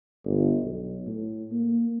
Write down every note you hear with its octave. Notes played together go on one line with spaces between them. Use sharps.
G1
B1
A2
A#3